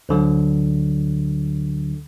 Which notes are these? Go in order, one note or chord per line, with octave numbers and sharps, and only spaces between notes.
D2 D3 F#3